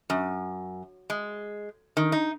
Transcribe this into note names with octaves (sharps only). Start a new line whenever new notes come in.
F#2
G#3
D#3
D#4